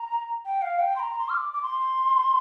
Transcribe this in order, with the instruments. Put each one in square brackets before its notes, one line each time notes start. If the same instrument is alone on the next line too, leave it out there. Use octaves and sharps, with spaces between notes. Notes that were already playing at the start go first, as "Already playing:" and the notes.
Already playing: [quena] A#5
G5
F5
G5
C6
A#5
C6
F6
D6
D6
C6